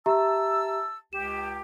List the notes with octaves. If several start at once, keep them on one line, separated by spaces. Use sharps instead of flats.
G4 E5 A5 A#5 E6
C#2 G4 E7